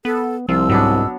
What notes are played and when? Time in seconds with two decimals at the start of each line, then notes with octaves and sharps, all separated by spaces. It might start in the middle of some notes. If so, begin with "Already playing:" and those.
0.05 B3 A4
0.49 C2 F3 E6
0.69 G#2 F#3 B3 D4